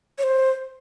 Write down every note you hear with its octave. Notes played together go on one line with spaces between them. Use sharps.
C#5
C5